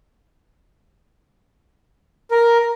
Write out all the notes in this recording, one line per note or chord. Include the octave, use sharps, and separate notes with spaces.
A#4